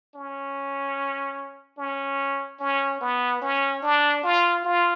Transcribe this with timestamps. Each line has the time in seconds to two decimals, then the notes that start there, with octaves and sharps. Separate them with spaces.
0.15 C#4
1.78 C#4
2.60 C#4
3.01 B3
3.42 C#4
3.83 D4
4.24 F4
4.65 F4